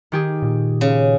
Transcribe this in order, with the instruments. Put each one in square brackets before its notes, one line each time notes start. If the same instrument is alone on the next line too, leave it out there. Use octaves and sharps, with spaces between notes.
[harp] D#3 G4 G#4
[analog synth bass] A#2
[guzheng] C#3